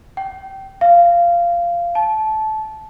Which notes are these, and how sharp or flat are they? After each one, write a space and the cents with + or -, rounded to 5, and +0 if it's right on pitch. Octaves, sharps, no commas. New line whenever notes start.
G5 -20
F5 -15
A5 -20